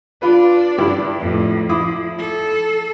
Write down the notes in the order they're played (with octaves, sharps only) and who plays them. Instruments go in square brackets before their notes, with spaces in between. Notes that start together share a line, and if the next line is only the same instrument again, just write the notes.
[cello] D4 D5 [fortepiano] F4 B4
[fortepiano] G2 E4 G4
[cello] F2 A2
[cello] F3 [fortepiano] E4 D6 D#6
[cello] A4